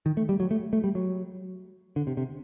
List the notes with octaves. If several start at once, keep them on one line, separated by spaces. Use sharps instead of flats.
D#3
A3
G3
F#3
A3
A3
G3
F#3
D3
C3
C3